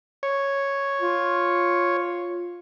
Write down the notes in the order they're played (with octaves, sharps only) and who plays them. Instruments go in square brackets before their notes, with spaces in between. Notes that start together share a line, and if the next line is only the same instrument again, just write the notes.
[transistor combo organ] C#5
[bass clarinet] F4